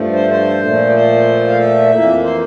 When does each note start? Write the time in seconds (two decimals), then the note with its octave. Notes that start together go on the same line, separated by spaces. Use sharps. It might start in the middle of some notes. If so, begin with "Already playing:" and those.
Already playing: G2 F3 A3
0.13 C5
0.30 C5
0.62 A#2 F3 A3
0.87 D5
0.94 C5
1.49 F5
1.58 E5
1.91 F2 E3 A#3
2.23 C5